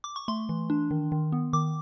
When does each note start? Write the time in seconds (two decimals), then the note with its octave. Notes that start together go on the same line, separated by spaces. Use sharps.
0.04 D6
0.16 C#6
0.28 A3 C6
0.49 E3
0.70 D4
0.91 D#3
1.12 D#3
1.32 B3
1.53 D#3 D6